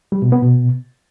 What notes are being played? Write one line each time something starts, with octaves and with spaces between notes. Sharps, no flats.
G3
B2
B3
B2